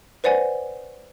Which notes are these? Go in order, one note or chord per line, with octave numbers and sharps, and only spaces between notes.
B4 C5 D5 F#5 G#5